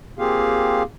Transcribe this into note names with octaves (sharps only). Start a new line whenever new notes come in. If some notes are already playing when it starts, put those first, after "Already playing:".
A#3 C4 F4 G4 G#4 F5